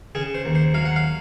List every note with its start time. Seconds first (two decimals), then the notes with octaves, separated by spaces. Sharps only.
0.15 C#3 G#4
0.35 C5
0.45 D#2
0.55 C5
0.74 F#3 F5
0.85 F#5
0.96 F5